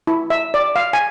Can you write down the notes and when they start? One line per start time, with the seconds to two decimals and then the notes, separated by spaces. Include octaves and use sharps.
0.07 E4
0.30 E5
0.54 D5
0.76 F5
0.93 G#5